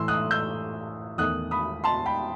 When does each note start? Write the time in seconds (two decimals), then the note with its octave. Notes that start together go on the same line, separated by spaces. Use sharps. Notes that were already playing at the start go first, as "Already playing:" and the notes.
Already playing: A2 E3 A3 C6 E6
0.08 D#6 F#6
0.31 E6 G6
1.18 E2 D#3 A3 D#6 F#6
1.51 B5 D#6
1.84 A5 C6
2.06 G5 B5